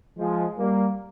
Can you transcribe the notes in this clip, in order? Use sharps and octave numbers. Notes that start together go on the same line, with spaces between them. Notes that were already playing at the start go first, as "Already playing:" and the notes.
F3 G#3
G3 A#3